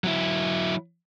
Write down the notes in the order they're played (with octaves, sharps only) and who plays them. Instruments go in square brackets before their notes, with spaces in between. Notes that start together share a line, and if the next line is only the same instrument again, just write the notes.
[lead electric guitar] F#3 E4